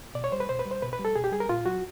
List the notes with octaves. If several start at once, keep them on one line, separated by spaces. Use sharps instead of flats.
B2 D5
C#5
G3 C5
B4
B2 C5
B4
G3
C5
B2 B4
B4
G3
A4
B2 G#4
G4
G3 G#4
A#4
A#2 F4
F#3 F#4